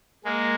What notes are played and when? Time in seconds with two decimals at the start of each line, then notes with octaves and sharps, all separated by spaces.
0.25 G#3 A#3